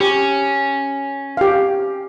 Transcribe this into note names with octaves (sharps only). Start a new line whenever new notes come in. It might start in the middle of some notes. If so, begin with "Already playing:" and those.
C#4 G4
G4 F5